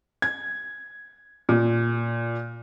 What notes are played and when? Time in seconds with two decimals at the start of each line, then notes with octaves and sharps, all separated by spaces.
0.22 G#6
1.49 A#2